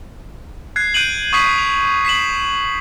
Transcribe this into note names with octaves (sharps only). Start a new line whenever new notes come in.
F#6 G#6 C7
F#6 G6 D7 D#7 F#7
C#6 D#6 G#6 B6 C7 F#7
F7
B6 C7 E7 F#7